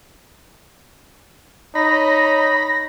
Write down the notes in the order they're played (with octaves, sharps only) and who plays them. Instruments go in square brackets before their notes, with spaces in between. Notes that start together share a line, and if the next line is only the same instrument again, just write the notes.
[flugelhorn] D#4 [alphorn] C#5 [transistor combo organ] B5 [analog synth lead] A#6